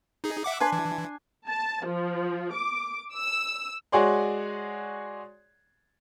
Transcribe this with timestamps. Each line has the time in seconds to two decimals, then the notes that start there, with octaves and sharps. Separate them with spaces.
0.24 D#4 G#4
0.44 E5 F#5 D6
0.60 D4 B4 G#5 C6
0.72 E3
1.48 A5
1.85 F3
2.53 D6
3.15 E6
3.92 G#3 F#4 G#4 C#5 D5 C6